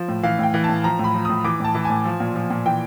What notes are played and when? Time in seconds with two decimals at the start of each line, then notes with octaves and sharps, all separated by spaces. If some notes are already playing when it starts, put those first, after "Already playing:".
Already playing: F3
0.08 A2
0.23 E3 F5
0.39 A2 G5
0.54 E3
0.64 A5
0.69 A2
0.84 F3 A#5
0.99 A2
1.04 B5
1.14 F3
1.25 A2 D#6
1.44 E3 D6
1.60 A2 A5
1.75 E3
1.85 G#5
1.90 A2
2.05 F3
2.20 A#2
2.35 F3
2.50 A#2
2.66 E3 G5